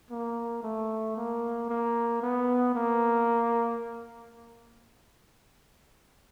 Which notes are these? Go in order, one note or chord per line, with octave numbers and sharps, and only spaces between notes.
A#3
A3
A#3
A#3
B3
A#3